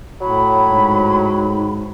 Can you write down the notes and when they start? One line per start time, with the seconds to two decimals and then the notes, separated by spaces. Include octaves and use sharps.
0.21 A2 F#3 B5
0.68 G#2